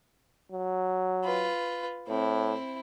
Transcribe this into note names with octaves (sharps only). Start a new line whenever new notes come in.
F#3
F4 B4
A2 C4 E4